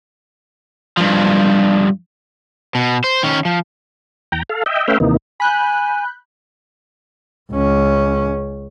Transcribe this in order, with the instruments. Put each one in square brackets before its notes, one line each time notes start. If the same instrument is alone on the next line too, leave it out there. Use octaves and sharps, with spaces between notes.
[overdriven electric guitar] G2 F3
B2
C5
D#3 C#4
F3
[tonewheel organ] E2 G5 A#5
A4 F5
D#5 E5 G5
A3 C#4 B4 E5 F5 G5
D#2 C3 E3 A#3 D#4
[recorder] G#5 [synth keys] B5 F#6 G6
[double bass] C#2 C#4